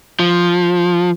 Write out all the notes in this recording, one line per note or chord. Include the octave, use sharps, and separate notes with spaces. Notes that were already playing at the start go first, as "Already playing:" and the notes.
F3